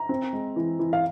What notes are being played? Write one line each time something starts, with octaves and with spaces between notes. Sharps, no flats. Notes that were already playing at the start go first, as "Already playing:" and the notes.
Already playing: A#5
C4
G#3
E3
E3
F5